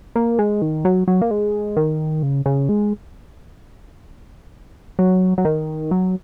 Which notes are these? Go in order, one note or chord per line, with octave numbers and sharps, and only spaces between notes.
A#3
G#3
D#3
F#3
F#3
A#3
G#3
D#3
C#3
C#3
G#3
F#3
F#3
D#3
F#3